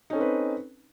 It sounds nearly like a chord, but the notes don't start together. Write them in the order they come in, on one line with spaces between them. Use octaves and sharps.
D#4 C#4 A4 C4 B4